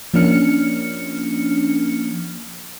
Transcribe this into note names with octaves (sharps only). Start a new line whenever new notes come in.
F3 A#3 C#4 D4 F6 C#7